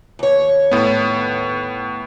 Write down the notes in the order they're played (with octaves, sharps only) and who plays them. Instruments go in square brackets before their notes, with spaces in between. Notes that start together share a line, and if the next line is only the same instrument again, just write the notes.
[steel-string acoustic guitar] D#2 C#5
[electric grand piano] A2 B3